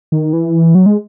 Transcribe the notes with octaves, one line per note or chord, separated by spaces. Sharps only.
D#3
E3
F#3
G#3